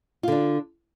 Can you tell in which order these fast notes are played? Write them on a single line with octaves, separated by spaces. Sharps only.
F4 D3 D4